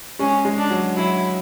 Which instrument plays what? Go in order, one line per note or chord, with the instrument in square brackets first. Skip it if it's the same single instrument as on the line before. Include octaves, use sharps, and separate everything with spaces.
[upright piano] G#3 [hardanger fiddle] C#4
[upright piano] G#3
[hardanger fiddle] D4
[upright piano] F#3
[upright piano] F#3 [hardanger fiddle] E4